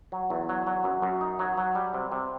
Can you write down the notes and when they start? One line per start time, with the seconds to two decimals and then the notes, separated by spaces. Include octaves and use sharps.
0.12 F#3
0.30 E2
0.49 F#3
0.67 F#3
0.84 F#2
1.02 F#2
1.21 D#4
1.39 F#3
1.57 F#3
1.75 G3
1.94 C3
2.12 C3